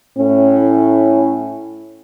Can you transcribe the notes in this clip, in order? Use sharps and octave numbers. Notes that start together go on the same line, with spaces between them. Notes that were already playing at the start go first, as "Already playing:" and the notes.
A2 C#4 E4